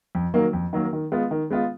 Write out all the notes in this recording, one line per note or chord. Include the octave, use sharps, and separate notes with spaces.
F2
D#3 F#3 A#3
F2
D#3 F#3 A#3
D#3
G#3 B3 F4
D#3
G#3 B3 F4